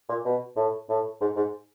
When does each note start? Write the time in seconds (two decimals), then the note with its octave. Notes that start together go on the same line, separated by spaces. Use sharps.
0.09 A#2
0.25 B2
0.56 A2
0.89 A2
1.21 G#2
1.36 G#2